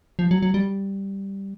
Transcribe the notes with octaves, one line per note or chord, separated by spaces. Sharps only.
F3
F#3
F#3
G3